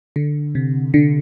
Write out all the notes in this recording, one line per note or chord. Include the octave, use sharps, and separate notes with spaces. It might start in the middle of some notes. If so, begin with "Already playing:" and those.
D3
C3
D3